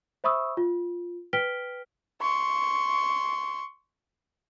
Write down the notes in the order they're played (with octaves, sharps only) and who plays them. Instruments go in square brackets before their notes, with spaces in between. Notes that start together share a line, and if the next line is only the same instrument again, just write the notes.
[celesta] C5 E5 B5 C#6 D#6 E6
F4
B4 G5 F6 B6 D7 G7
[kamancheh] C6 C#6